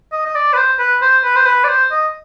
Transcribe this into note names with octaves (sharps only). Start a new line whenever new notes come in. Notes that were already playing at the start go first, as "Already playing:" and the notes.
D#5
D#5
D5
B4
C5
B4
C5
B4
C5
B4
D5
C5
D#5